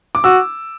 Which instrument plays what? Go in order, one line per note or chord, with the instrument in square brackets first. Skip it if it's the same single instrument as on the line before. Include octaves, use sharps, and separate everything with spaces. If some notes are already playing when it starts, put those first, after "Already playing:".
[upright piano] D6
[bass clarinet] F#4 [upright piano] E6